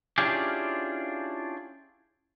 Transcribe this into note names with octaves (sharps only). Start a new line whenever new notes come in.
C#4 D4 E4 F4 G4 G#4